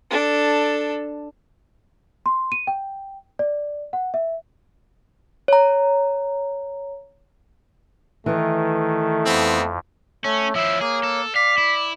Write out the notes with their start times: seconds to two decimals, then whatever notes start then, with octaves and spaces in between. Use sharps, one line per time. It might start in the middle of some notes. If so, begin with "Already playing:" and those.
0.11 D4 A4
2.26 C6
2.52 D#7
2.67 G5
3.39 D5
3.93 F#5
4.14 E5
5.48 C#5 A#5
8.26 D#3 E3 A3
9.26 F2 B3 C4
10.24 A3 C#4 C#5
10.55 F3 E4 E5
10.81 A#3 G#4
11.03 A4
11.36 D5 F5 B6
11.58 E4